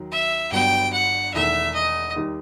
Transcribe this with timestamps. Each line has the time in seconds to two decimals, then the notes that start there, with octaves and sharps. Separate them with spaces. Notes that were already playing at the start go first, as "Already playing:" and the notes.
Already playing: D#2 D#3 F#3
0.11 E5
0.51 G1 G2 F#3 B3 G5
0.92 F#5
1.33 E1 E2 D#3 A3 E5
1.74 D#5
2.16 D#2 D#3 G3